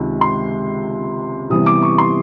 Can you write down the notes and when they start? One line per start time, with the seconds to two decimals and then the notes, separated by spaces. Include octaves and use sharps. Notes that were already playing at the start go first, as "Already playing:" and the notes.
Already playing: C#2 C3 D#3
0.21 C6
1.50 C3 E3 G3 B3 D#6
1.66 D6
1.83 C#6
1.98 C6